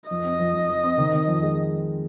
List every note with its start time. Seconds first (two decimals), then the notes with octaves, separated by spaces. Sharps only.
0.10 F2 D#5
0.24 C4
0.39 F2
0.54 F2
0.69 F3
0.84 C4
0.98 D#3
1.13 D#3
1.27 F2
1.43 G#3